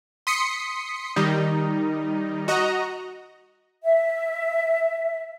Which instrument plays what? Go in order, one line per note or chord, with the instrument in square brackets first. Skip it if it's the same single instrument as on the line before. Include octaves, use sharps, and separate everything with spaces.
[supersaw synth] C6 D#6 B6 C#7
D#3 G3 D#4
F#4 D#5 A#5
[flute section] E5